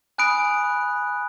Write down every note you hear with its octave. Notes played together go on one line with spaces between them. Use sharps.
G#5 B5 D#6 F#6 D7